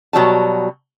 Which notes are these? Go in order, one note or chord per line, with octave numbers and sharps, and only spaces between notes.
B2 F#3 G3 A5